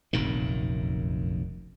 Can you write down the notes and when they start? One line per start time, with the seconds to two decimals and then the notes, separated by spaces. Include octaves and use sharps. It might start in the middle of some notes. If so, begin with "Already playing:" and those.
0.13 F1 A#1 F#2 D#3